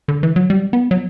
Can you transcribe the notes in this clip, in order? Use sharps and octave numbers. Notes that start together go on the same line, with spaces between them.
D3
E3
F#3
G3
B3
F#3